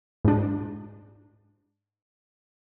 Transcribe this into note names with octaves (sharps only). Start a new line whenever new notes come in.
G#2 D4